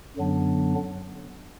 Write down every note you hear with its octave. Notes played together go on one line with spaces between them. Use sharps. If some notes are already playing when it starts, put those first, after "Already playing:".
F#2 D3 F#3 B3 D4